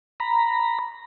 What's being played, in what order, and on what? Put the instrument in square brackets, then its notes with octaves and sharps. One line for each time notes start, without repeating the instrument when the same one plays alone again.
[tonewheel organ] A#5 B5